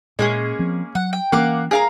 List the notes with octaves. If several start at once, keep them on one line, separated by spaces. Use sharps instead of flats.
A#2 G#3 A#3 C#4 G#4
F3 C4
F#3 F#5
G5
E3 A#3 C4 C#4 F5 F#5 D6
G#4 A#4 F5 A#5